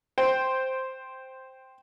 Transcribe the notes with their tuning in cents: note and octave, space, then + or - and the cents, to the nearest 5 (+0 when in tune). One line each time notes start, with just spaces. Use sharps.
C5 +0 G5 +0